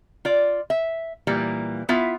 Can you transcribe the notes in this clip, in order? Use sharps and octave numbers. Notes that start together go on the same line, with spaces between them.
F4 D5
E5
A#2 E3 G3 A#3
B3 E4 F4 E5